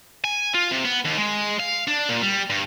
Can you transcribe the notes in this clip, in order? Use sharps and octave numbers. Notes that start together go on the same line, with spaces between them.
G#5
F4
C3
B3
D#2
G#3
F5
D4
A#2
G3
G2